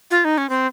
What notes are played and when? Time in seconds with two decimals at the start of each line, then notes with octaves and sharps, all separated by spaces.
0.11 F4
0.25 D#4
0.38 C#4
0.49 C4